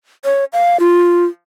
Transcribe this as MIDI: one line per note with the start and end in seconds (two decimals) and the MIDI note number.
0.25 0.45 73
0.53 0.80 77
0.80 1.25 65